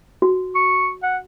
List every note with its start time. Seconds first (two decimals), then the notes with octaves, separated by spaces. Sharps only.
0.22 F#4
0.55 C#6
1.03 F#5